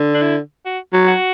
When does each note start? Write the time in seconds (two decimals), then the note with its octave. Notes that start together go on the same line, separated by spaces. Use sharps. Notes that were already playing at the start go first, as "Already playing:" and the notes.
Already playing: D3
0.14 D4
0.22 E4
0.65 F#4
0.93 F#3
1.07 F#4